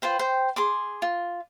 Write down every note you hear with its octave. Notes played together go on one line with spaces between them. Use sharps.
F4 B4 C5 G5
C5 G5
G#4 C6 D6
F4